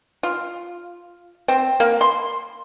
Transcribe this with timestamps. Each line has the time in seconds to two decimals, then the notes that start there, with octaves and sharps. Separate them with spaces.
0.23 F4
1.48 C4
1.80 A#3
2.01 C6